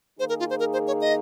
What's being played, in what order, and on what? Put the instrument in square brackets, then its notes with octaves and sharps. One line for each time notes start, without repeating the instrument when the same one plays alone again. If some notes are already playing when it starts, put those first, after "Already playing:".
[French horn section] D#3 A#3 D#4 G#4 [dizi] C5
[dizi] A#4
F4
C5
A#4
C5
C#5
D#5